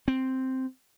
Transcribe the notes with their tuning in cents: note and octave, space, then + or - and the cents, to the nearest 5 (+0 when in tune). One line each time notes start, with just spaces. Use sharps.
C4 +0